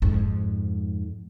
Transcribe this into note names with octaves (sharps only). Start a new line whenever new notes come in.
F2 G#2